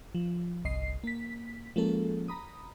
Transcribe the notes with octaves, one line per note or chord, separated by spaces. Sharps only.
F3
G1 C2 D#5 C7
A#3 B6
F3 G#3 A#3 C#4 A4
A#5 B5 D#6